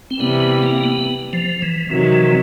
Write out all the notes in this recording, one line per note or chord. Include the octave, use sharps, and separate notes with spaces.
C4
C3 E3 G3 B3
B3
A#3
B3
F3
E3
C3 D#3 E3 F#3
E3